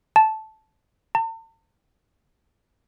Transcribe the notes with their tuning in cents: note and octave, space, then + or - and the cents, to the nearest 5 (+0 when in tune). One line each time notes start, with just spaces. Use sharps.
A5 -10
A5 +45